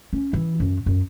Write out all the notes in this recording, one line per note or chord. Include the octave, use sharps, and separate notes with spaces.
C#4
E3
F#2
F#2